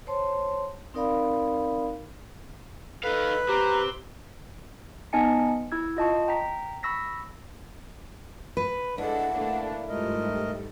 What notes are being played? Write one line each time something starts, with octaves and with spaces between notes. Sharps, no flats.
C5 C#5 A5 C6
C4 D#4 A#4 D5 F5 B5
D#4 A4 B4 F5
C4 G4 A#5
B3 D#4 D#5 G#5 A5 C#7
E4 E6 G#6
F4 D#5 A5 C#6
G5 A#5 B6
B5 C#6 E6 A#6 B6
B4
G#3 D4 E4 A4 F#5
A3 A#3 D4
G#2 G3 A3 F4 A#4 D#5
A4